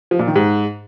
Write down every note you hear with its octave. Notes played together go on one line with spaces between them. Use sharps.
F3
A#2
D#3
G#2